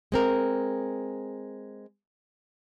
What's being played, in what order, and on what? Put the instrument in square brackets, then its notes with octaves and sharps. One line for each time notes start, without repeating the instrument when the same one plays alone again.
[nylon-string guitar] G#3 C4 A#4